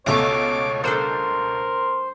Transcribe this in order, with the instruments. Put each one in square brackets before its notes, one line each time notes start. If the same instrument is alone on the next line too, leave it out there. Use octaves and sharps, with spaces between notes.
[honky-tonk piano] C#2 B2 [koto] A3 C#4 [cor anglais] C#5 [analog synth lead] D6
[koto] G3 D4 A4 [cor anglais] A#4 [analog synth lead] C5